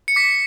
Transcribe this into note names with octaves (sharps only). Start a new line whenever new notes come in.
C#7
D6 B6